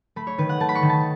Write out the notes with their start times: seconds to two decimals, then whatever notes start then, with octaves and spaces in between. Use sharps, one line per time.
0.16 A3 B5
0.27 C#5
0.38 D#3 B4
0.49 F#5
0.60 A3 A5
0.69 B5
0.75 C#6
0.82 D#3
0.89 A5